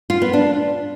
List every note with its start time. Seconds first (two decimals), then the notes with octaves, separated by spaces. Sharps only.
0.10 F4
0.22 B3
0.33 D4